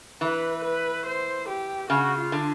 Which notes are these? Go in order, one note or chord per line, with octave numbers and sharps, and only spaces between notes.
E3 B4
B4
C5
G4
C#3 F#4
F4
D3